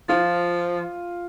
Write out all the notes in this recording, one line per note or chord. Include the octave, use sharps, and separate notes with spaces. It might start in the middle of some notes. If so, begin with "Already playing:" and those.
F3 F4